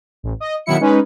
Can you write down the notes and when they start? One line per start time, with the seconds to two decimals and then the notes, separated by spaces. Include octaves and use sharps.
0.23 A1
0.40 D#5
0.66 B2 D#3 F#3 E4 C#7
0.80 G#3 C#4 D#4 B4